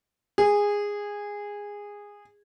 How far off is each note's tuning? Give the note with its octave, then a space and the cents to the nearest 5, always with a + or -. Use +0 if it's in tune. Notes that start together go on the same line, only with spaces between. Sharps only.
G#4 -15